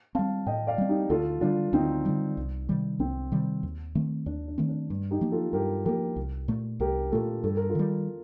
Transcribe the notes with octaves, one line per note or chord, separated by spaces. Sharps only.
G3 C4 F5 A5
A2 D#5 G5
D5 F5
G3 C4
D#4 G4
D2 F4 A4
D3 G3 D4 F4
D2 C4 D#4
D3 G3
C2
C3 D#3 G3
C2 C4
C3 D#3 G3
D#2
D#3 A3 C4
D#2 D4
D4
D#3 A3 C4
D4
G2
D#4 G4
F3 A#3
F4 A4
G2 G4 A#4
F3 A#3 G4 A#4
C2
A#2 A3
C2 G4 A#4
A#2 A3 F4 A4
G2 A4
A#4
F4 A4
D#3 G3